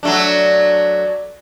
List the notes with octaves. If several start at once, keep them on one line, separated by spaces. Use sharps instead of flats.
F#3 A3 D4